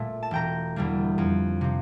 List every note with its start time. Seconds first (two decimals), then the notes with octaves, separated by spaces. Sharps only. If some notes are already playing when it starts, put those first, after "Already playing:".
Already playing: A#2 A3
0.23 A5
0.31 E1 G5 A#5
0.76 E2 D3 G3 A#3
1.18 F2
1.61 C3 F3